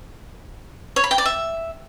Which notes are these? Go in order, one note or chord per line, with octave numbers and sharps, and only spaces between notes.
C#5
B5
G5
D5
E5